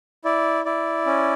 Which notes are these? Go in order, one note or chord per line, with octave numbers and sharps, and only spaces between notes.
E4 D5
E4 D5
C#4